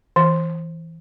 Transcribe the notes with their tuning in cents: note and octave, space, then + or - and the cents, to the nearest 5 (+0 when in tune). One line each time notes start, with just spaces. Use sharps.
E3 -5